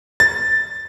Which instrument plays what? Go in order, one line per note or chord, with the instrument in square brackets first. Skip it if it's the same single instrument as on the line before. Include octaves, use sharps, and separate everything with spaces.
[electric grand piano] A6